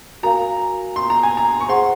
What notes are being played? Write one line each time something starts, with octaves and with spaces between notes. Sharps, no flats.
F#4 A#4 F5 G#5 A#5
C6
A#5
G#5
A#5
C#6
G#4 C5 F#5 C6